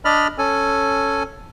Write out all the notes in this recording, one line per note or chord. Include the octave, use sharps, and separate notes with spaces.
D4 D5 D#5 B5 F6
C#4 A4 G#5